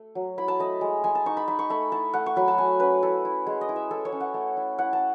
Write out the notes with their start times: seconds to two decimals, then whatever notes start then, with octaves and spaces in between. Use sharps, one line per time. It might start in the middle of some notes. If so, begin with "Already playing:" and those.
Already playing: A3
0.15 F#3
0.38 E4 B5
0.48 A5
0.60 A3 D#5
0.81 G#3
1.04 G#3 G#5
1.15 A5
1.26 D#4 C#6
1.37 B5
1.48 D#4 B5
1.59 C#6
1.70 A3 B5
1.92 E4 A5
2.14 A3 F#5
2.26 C#6
2.36 F#3 B5
2.48 A5
2.58 A3 G#5
2.80 C#4 B4
3.03 E4 A4
3.25 E4
3.46 G#3 G#4
3.61 D#5
3.69 E4
3.76 E5
3.91 E4 A4
4.05 C#5
4.12 C#4
4.20 F#5
4.34 A3
4.57 E4
4.79 E4 F#5
4.93 A5